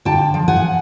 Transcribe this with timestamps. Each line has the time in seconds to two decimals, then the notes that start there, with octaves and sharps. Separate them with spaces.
0.05 D3 G5 A5
0.34 F3
0.48 F#5 G#5